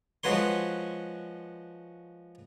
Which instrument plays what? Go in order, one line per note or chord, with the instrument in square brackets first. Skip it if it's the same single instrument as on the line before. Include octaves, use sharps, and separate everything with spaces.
[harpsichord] F3 G#3 F#4 B4 C#5 C6